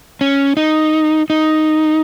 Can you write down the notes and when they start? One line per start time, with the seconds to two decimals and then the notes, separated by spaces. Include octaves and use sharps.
0.21 C#4
0.57 D#4
1.30 D#4